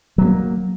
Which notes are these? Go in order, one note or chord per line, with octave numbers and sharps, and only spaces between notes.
F#3 G#3 A#3